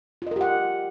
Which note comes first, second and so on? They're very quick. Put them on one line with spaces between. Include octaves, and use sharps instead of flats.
F4 D#5 A#4 G4 F#5